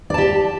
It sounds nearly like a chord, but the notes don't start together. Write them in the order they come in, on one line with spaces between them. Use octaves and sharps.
D5 A5 G4